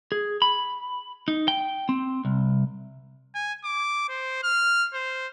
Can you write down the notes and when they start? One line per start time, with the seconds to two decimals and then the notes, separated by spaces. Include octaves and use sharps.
0.12 G#4
0.42 B5
1.28 D#4
1.48 G5
1.89 C4
2.25 C2
3.35 G#5
3.64 D6
4.09 C5
4.44 F6
4.94 C5